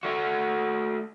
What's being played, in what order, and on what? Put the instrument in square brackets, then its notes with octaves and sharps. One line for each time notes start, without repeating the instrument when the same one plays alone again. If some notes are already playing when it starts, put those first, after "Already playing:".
[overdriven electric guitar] A3 F#4